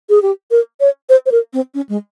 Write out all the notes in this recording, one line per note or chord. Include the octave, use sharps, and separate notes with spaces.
G#4
G4
A#4
C#5
C5
C5
A#4
C4
C#4
G#3